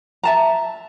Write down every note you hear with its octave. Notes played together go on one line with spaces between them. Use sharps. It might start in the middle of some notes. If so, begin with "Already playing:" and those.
E5 A5 A#5